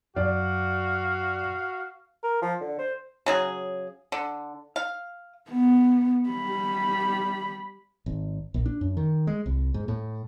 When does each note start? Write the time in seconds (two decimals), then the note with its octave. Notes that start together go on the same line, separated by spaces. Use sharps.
0.16 F#2 F#4 D5 F5
2.23 A#4
2.42 F3
2.61 D3
2.79 C5
3.26 C#3 F#3 G#4
4.12 D3
4.76 F5
5.50 B3
6.29 G3 B5
8.06 G#1
8.54 A#1
8.66 D4
8.81 F#2
8.97 D#3
9.27 G#3
9.46 C2
9.74 G#2
9.88 A2